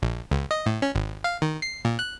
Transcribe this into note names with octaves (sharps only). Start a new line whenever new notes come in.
A#1
C#2
D#5
A2
C#4
G#1
F5
D#3
C7
A#2
F#6